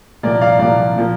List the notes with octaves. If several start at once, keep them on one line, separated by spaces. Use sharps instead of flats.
C2 A#2 F3 A#3 D5
D5 F5
C2 A#2 F3 A#3 D5 F5
A#2 F3 A#3